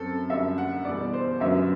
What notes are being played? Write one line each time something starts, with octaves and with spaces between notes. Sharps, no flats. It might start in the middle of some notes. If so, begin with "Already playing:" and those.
Already playing: F#2 F#3 C4 A4
F#2 D3 G3 E5
F#5
E2 B2 G3 D5
C5
F#2 D3 F#3 B3 E5